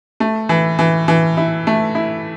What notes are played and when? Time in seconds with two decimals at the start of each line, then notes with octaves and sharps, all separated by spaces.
0.20 A3
0.49 E3
0.79 E3
1.08 E3
1.37 E4
1.67 A3
1.95 E4